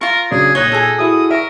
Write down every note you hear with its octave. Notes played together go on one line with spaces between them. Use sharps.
F4 A#4 C#6
C#3 F#3 D4 G#4
A#2 D#4 C#5 F#6 G7
G#4 A4
E4 F#4 D#6
A#4 E5 C#6